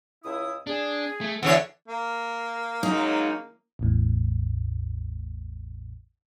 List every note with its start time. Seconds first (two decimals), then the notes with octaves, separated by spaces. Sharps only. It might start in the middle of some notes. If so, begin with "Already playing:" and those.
0.24 C#2 E4 D#6
0.67 D4 G#4
1.21 A3
1.43 E2 D3 E4 F#4 C#5
1.88 A#3
2.83 C#3 F#3 G#3 D#4
3.79 A1 E2 A2